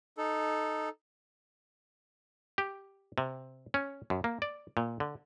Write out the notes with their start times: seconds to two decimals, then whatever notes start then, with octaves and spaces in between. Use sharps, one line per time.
0.18 D#4 A4
2.58 G4
3.18 C3
3.74 C#4
4.10 F#2
4.24 A#3
4.42 D5
4.77 A#2
5.00 D3